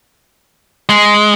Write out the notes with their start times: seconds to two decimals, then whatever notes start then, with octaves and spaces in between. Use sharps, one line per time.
0.89 G#3